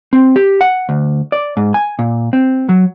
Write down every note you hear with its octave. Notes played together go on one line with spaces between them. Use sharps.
C4
G4
F#5
D2
D5
G#2
G#5
A#2
C4
F#3